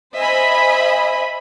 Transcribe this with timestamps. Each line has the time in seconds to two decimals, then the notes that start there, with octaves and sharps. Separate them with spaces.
0.14 C5 D#5 E5 G#5 B5